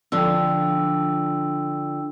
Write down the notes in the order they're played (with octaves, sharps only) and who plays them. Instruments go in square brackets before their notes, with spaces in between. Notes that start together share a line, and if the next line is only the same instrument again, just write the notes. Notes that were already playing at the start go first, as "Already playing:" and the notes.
[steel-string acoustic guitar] D3 F3 D4 [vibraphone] G5 E6